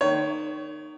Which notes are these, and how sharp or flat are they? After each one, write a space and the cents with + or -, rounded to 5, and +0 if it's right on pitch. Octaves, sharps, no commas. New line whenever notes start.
D#3 -20 C#5 +15